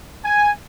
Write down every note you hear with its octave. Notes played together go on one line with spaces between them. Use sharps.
G#5